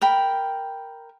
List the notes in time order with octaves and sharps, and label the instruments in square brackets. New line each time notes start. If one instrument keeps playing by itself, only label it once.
[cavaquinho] A#4 G5 B5